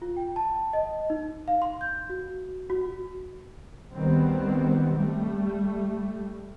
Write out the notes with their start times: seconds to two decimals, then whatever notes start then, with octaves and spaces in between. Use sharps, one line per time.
0.02 F4
0.17 G5
0.36 A5
0.73 D#5
1.10 D#4
1.48 F5
1.62 C6
1.81 G6
2.10 F#4
2.70 F#4
3.94 D2 D#3 G3 B3 C4
4.92 G3 A3